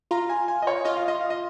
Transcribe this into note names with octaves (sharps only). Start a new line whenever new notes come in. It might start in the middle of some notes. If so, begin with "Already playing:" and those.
F4 A#5
G#5
G#5
D#5
C#5
F4 D#5
F5
D#5
F5
D#5